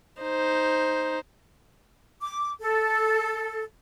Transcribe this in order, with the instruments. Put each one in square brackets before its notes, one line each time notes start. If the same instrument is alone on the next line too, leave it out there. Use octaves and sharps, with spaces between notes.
[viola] D#4 C5
[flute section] D6
A4